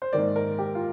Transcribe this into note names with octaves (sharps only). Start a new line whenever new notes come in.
C5
G#2 D#3 A#3 D5
A#4
G4
F4